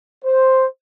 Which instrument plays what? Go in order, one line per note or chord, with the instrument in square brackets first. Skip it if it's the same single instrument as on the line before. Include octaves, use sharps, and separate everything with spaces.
[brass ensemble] C5